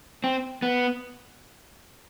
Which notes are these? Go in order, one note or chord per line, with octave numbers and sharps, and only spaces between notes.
C4
B3